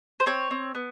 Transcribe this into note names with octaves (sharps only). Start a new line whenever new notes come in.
C5
C4 C#5
C4
B3